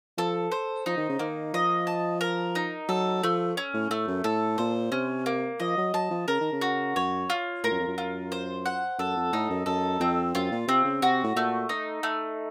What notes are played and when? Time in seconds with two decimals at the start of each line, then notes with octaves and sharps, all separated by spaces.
0.18 F3 A4
0.52 C5
0.86 F3 D#4
0.97 D#3
1.09 C#3
1.19 D#3 A#3
1.53 F3 D#5
1.87 A5
2.21 A#4
2.55 D#4
2.88 F#3 A4
3.23 F3 A3
3.57 C#4
3.74 A2
3.90 A2 A3
4.07 F#2
4.24 A2 A4
4.58 A#2 C5
4.92 C3 C#4
5.26 A#3
5.60 F3 D#5
5.78 F#3
5.94 F#3 A5
6.11 F3
6.28 C#3 A#4
6.41 D#3
6.53 C#3
6.61 F#4
6.96 F#2 C#5
7.30 F4
7.64 A2 A#4
7.71 F#2
7.80 F2
7.88 F#2
7.98 F4
8.32 C5
8.66 F#5
8.99 F#2 A4
9.16 F2
9.33 A2 D#4
9.50 F#2
9.66 F#2 A4
10.00 F2 C4
10.35 F#2 F4
10.51 A#2
10.68 C3 C4
10.85 C#3
11.02 C3 F#4
11.24 A2
11.36 A#2 A3
11.69 D#4
12.03 A3